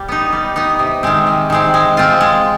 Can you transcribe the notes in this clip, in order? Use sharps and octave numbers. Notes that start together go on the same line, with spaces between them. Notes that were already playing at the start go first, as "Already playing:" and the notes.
Already playing: G3
B3 D#4
G3
B3 D#4
C3
D#3 G#3 C4
C3
D#3 G#3 C4
G#3
C4 F4
G#3